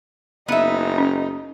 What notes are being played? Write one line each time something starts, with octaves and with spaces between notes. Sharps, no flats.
F#1 B3 D#4 E5
C#4